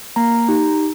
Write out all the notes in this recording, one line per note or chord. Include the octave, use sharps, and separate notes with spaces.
A#3 A#5
D#4 G4